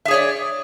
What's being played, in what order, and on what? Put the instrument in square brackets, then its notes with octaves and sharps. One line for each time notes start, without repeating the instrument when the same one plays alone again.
[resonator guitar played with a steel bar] E5
G#4
C#5
D5